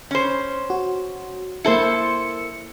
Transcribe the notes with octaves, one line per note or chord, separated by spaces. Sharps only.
C#4 C5
F#4
A#3 E4 A4 C5 C#7